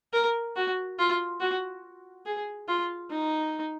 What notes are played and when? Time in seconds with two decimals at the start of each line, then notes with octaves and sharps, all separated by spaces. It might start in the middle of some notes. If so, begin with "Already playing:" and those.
0.13 A#4
0.56 F#4
0.99 F4
1.40 F#4
2.26 G#4
2.68 F4
3.10 D#4